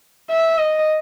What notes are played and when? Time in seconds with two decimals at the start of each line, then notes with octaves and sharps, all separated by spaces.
0.30 E5
0.58 D#5